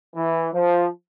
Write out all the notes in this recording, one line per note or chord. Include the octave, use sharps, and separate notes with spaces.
E3
F3